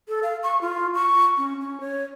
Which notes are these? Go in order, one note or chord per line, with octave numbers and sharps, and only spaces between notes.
A4
F5
C#6
F4
C#6
C#4
C#4
C#5